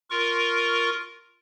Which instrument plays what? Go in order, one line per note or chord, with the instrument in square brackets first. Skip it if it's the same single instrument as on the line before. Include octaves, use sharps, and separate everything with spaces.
[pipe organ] F4 A#4 C#6